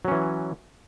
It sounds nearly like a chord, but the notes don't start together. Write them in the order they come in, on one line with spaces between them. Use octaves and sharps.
F#3 C#4 E3